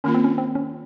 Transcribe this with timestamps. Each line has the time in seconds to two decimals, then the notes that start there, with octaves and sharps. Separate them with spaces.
0.04 D#3 A#3 C#4 F4
0.14 C4
0.24 C#4
0.38 C4
0.55 C#4